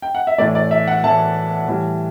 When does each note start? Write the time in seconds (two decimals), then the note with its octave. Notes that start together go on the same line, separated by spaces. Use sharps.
0.02 G5
0.15 F#5
0.27 E5
0.38 A2 E3 A3 D5
0.55 D5
0.71 E5
0.87 F#5
1.03 A2 E3 A3 A5
1.68 A2 E3 G3